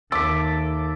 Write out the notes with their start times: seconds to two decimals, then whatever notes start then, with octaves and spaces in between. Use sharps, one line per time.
0.12 D#2 A4 E5 D6